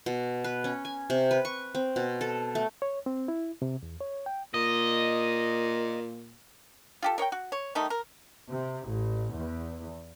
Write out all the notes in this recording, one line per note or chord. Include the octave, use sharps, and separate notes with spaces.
B2
B4
C#4
G#5
C3
B4
C#6
C4
B2
A4
A3
C#5
C4
E4
C3
E2
C#5
G5
A#2 D#5
F4 G4 A4
A#4 C#5 D5 G5
F#4
C#5
D#3 G3 A3 D#4
A#4
C3
A1
E2